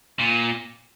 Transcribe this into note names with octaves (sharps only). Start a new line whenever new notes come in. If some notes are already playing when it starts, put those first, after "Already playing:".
A#2